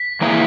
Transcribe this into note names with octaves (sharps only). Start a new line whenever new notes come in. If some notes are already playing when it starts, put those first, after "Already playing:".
Already playing: B6
E3 A#3 E4 G#4